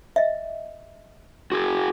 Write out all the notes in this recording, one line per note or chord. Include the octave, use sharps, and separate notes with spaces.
D#5 E5
F#4 G#4